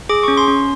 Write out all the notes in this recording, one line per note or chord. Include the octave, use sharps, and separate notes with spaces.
G#4 D6
C#6
C#4
C6
C#4